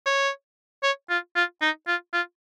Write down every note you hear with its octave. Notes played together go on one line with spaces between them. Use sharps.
C#5
C#5
F4
F4
D#4
F4
F4